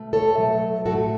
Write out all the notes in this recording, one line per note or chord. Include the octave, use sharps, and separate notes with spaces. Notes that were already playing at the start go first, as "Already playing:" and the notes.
Already playing: B2 A3
A4 C#5
B2 F#3 A3
A2 F#3 A3 F#4 A4